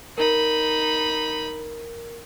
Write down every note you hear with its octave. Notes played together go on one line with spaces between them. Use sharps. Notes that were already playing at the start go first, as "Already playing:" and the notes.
D#4 A#4 B5